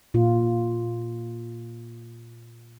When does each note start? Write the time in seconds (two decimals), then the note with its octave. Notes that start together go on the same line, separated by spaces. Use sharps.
0.14 A#2 F4